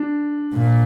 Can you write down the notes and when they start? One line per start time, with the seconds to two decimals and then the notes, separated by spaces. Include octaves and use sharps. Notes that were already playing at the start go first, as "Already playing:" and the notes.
Already playing: D4
0.54 A#2